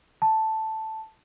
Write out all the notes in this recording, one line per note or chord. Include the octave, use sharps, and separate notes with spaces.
A5